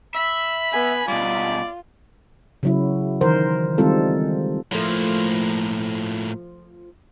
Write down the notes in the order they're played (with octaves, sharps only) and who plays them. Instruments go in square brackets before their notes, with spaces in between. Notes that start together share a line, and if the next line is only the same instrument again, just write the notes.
[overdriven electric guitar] E5 [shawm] B5
[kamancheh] B3 G#5
[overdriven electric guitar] B2 G3 [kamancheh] F4 [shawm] D5
[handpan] C#3 F#3 E4
D#3 E3 A#4 C5
D#3 G3 G#3 C4 F4 A4
[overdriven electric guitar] A2 A#3 [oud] F3 A3